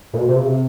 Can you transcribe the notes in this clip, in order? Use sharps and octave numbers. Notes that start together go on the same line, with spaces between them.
A#2
B2
C3
C#3
C3